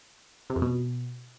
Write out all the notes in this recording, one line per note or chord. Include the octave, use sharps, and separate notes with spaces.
C3
F2
B2